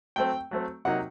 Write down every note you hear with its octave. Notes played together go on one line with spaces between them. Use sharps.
F#3 A3 C4 G5
F#3 A3 C4
C3 F#3 A#3 D#4 F#5